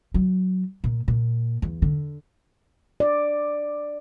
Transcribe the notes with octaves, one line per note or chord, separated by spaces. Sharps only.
F#3
A#2
A#2
E2
D3
D5